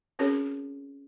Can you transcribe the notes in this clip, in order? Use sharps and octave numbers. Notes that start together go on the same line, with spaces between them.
C4 C#4 F#4 G#4 A#4 C#5